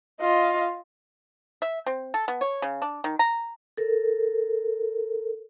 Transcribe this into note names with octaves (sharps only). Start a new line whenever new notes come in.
F4 D#5
E5
C4
A4
B3
C#5
C#3
D4
D#3
A#5
A4 A#4